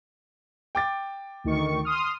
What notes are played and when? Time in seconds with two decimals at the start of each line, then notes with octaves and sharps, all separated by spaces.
0.75 G5 D6 A6
1.44 D2 D#3 C#6
1.85 C6 D#6 F6